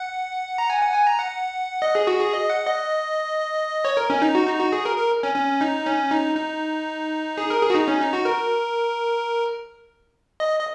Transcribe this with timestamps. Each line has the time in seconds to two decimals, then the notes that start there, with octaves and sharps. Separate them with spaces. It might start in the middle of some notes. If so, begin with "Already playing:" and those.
Already playing: F#5
0.58 A#5
0.70 G#5
0.81 F#5
0.94 G#5
1.07 A#5
1.19 F#5
1.82 D#5
1.95 G#4
2.07 F#4
2.20 G#4
2.33 D#5
2.50 F#5
2.66 D#5
3.85 C#5
3.97 A#4
4.10 C#4
4.22 D#4
4.35 F#4
4.47 D#4
4.59 F#4
4.72 G#4
4.85 A#4
4.98 A#4
5.23 C#4
5.36 C#4
5.61 D#4
5.86 C#4
6.11 D#4
6.37 D#4
7.37 G#4
7.50 A#4
7.62 G#4
7.70 F#4
7.75 D#4
7.88 C#4
8.01 D#4
8.13 F#4
8.25 A#4
10.40 D#5
10.59 D#5